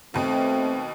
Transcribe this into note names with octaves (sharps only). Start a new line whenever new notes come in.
D#2 B2 A3 C4